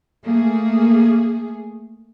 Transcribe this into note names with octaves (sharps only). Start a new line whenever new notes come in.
A3 A#3 G#4